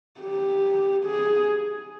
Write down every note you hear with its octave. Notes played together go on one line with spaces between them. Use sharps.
G4
G#4